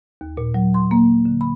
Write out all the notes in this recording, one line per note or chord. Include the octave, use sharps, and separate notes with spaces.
D#2
A#2
F#3
C6
A#3
D3
B5